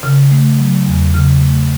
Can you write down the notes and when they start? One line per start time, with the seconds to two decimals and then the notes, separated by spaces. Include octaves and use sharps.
0.03 C#3
0.31 A3
0.59 F#3
0.86 E2
1.14 C#3
1.41 A3